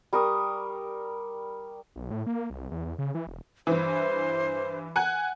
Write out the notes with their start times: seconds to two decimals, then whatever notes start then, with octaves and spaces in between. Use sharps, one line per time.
0.13 G3 A#4 C#6 D#6
1.96 B1
2.11 A2
2.26 A#3
2.50 C2
2.71 E2
2.85 E2
2.98 C#3
3.15 E3
3.27 E1
3.67 G2 E3 C5
4.96 F#5 G#5 F#6